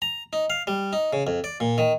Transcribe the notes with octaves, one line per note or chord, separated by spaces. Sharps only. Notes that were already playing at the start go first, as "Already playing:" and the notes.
A#5
D#4
F5
G3
D#4
C#3
F2
D5
A#2
D#3